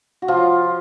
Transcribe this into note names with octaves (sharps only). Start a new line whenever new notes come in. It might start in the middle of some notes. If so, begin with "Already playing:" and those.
F#4
F3 F4